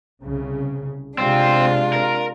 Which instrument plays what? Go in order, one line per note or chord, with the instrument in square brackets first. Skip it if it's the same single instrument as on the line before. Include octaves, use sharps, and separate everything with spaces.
[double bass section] C2 C#3
[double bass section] C3 G#3 [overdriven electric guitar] C4 [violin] D4 F4
[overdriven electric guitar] A#4